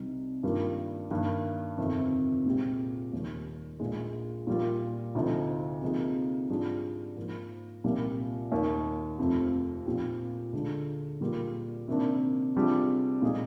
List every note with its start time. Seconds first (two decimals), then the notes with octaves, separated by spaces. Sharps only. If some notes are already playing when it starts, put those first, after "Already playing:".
Already playing: C2 C3 G3 C4 D#4
0.43 G2 D#3 G3 A#3 F4
1.10 G2 D#3 A#3
1.78 G1 F2 C3 D#3
2.45 C2 A#2 G#3 C4 G4
3.13 D#2 D#3 G3
3.80 A#1 A#2 G#3
4.47 A#2 G3 A#3 F4
5.15 D2 C3 F3 C4 D#4
5.82 C3 F3 A#3 D#4 G#4
6.49 G#2 G3 D4 F4 G#4
7.17 G#2 F3 A#3
7.84 C2 A#2 G3 A#3
8.51 D#2 D#3 A#3 D#4
9.18 F1 F2 C3 F3
9.86 A#2 F3 C4 G4
10.53 D2 D3 G#3 D4 F4
11.21 A#2 G3 A#3 F4 G#4
11.88 C3 D#3 A#3 D4
12.55 C3 G3 D4 F4 G#4
13.22 A#2 G#3 D#4 G#4